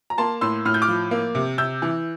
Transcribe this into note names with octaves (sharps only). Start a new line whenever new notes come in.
A#5
A#3 A5 C6
A2 C6 E6
A2 F6
G6
D6 F6
F3
A#3
C3
C3 E6 G6
E3